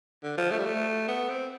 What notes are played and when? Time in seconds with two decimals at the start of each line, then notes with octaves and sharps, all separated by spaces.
0.23 D3
0.38 F3
0.51 A3
0.59 G3
0.65 A3
1.08 B3
1.29 C4